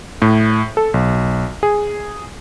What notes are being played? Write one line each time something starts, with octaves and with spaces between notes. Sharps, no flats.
A2
A4
B1
G#4